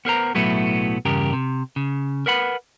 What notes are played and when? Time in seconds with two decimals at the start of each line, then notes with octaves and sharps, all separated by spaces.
0.05 B3 A#4 C5 A#5
0.35 B1 A2 F#3 A3 B3 E4
1.05 E2 G2 C#3 G4 A#4
1.33 C3
1.76 C#3
2.26 A#4 B4 F#5 B5